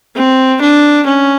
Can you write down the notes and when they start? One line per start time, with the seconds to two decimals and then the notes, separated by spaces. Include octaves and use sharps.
0.16 C4
0.62 D4
1.07 C#4